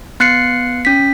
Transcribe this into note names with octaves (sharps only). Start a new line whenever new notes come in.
B3 F#6 C7 C#7
C#4 B6